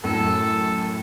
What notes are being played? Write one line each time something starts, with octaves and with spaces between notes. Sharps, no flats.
F#2 A2 A4